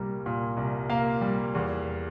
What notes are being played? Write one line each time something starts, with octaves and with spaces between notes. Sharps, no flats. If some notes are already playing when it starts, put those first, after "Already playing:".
Already playing: C2 A#2 G3 A#3 A#5
A#2
C2
A#3 F5
G3
E2